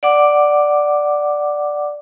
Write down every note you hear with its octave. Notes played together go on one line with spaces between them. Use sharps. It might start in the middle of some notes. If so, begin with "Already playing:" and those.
D5 F#5 D6